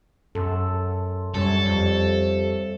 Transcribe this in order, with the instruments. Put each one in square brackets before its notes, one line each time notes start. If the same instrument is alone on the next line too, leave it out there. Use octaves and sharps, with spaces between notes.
[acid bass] F#2 [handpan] A4 [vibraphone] C6
[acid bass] F#2 [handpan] G3 C#5 [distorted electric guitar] A4
[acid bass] F2 [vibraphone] G4 C5 E5